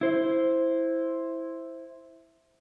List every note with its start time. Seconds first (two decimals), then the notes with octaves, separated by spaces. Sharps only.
0.01 E4 C5